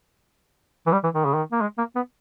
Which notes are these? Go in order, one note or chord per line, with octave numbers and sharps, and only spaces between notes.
E3
G3
E3
D#3
C#3
D#3
A#3
G#3
A#3
B3